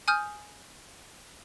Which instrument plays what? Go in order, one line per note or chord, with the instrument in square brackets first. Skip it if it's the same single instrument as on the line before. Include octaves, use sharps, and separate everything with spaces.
[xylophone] G#5 D#6 F6 G6